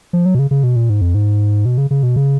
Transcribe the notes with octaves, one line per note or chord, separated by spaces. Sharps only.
F3
F#3
B2
C#3
C#3
B2
A#2
G#2
F2
G#2
B2
C#3
C#3
B2
C#3